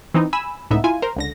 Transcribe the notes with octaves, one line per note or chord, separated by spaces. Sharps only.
E3 C4 D#4
G#5 B5 E6
C#2 A2 B3 D#4 E5
E4 F4 G#5
A#4 C5
C#2 D3 A#6